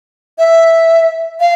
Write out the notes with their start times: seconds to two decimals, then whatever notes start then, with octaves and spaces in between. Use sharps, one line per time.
0.38 E5
1.40 F5